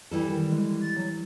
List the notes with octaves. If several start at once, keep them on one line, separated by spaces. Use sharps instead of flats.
E3 G3 E4 A4
D#3
G#3
A6
F#3